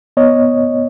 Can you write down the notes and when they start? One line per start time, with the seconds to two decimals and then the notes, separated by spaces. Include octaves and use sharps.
0.17 B3 C#5 D#5